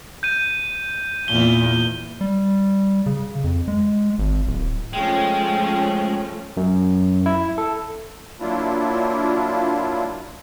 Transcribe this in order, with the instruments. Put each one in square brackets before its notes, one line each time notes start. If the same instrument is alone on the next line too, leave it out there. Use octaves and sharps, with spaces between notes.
[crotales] G6 D#7
[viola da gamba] E2 A#2 [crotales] G7
[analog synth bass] G3
C#3
F2
G#3
G#1
D1
[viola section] F3 A3 C#4 [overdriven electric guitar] G#3 [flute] G5
[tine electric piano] F#2
E4
A4
[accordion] F#3 A#3 D4 E4 F4